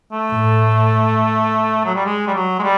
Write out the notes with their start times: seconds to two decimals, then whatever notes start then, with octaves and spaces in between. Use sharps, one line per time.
0.12 A3
0.33 A2
1.85 F#3
1.95 G3
2.05 G#3
2.27 G3
2.34 F#3
2.59 G#3
2.63 G3